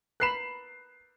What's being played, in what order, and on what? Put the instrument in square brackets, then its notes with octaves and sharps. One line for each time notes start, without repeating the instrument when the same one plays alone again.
[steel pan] A#4 B4 B5 [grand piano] F#6 C7 E7